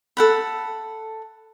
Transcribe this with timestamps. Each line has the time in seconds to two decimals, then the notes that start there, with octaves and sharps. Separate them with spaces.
0.17 A4 F#5 B5